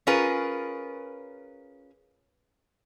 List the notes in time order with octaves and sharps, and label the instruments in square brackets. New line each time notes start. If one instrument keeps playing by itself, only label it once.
[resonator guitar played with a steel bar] C#4 F4 G#4 A#4 B4